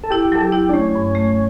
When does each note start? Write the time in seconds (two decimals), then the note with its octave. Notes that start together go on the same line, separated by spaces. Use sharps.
0.04 A4
0.11 E4 G4
0.32 F#3 A4
0.42 G4
0.52 E4
0.69 D4
0.73 A3 C#4
0.95 G2
1.15 A3